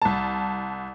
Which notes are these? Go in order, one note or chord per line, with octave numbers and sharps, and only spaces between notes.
C2 A5